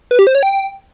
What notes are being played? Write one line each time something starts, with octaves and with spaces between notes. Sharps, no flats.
B4
G4
C5
C#5
G5